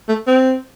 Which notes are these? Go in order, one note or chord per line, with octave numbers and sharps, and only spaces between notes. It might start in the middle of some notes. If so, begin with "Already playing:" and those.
A3
C4